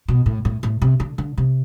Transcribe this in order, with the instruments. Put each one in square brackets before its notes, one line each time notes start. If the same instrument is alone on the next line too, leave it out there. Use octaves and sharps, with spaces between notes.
[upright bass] B2
A2
A2
A2
C3
D3
D3
C3